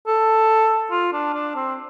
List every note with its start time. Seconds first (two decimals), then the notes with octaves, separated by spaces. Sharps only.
0.07 A4
0.91 F4
1.13 D4
1.34 D4
1.56 C4